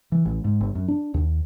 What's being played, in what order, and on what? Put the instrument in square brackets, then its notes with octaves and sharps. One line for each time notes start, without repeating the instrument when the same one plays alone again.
[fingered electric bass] E3
A1
G#2
G1
F#2
D4
D#2